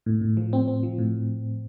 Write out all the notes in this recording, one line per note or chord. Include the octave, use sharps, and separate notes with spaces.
A2
A2
F3
C4
C4
F3
A2